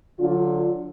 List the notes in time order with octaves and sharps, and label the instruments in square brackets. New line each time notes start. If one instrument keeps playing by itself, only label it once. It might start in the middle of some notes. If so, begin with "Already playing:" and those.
[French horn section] D3 F#3 F4